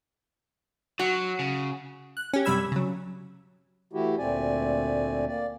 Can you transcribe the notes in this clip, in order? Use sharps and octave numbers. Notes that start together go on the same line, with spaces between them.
F#3 F#4
C#3
F#6
C#4 G4
F#2 C3 G3 B5 E6 G#6
C#3 F#3
E3 A3 E4 F#4 G4
D2 A#2 A3 C4 D5 G#5
A#3 D5